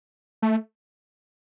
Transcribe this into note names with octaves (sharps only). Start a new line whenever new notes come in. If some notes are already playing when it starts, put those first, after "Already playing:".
A3